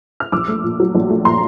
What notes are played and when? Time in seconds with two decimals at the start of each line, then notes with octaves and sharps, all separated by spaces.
0.20 F6
0.32 A#1 D6 E6
0.48 A3
0.64 A#2
0.80 F#3
0.95 A#1
1.10 A3
1.25 A#2 A#5 C6